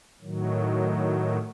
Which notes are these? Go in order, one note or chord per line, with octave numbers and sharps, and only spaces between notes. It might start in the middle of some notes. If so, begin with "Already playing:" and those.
A2 D#3 F#3